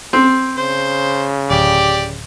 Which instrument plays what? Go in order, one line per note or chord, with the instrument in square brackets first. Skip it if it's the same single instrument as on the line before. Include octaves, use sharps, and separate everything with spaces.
[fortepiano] C4
[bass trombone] C#3 [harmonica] C5
[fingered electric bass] D1 [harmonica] G4 D5